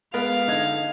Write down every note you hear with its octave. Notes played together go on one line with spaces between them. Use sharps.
G#3 B3 A#4 F5
D3 D#4 G#6